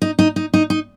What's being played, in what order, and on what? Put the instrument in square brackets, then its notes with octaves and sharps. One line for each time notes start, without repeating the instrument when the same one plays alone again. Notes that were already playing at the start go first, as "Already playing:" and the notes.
[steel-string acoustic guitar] D#4
D#4
D#4
D#4
D#4